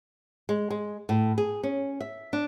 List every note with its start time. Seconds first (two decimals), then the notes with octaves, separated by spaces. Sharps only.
0.49 G#3
0.70 G#3
1.09 A2
1.38 G#4
1.63 C#4
2.01 E5
2.33 D4